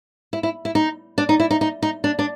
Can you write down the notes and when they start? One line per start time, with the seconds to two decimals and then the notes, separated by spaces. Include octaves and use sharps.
0.33 E4
0.43 E4
0.65 E4
0.75 D#4
1.18 D4
1.29 D#4
1.40 E4
1.51 D#4
1.61 D#4
1.82 D#4
2.04 D4
2.19 D4